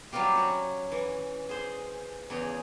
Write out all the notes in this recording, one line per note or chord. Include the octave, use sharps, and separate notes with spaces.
F#3 G3 C4 F4 G4
C#4 F#4
E3
G#4 C5
E2 C#3 G#4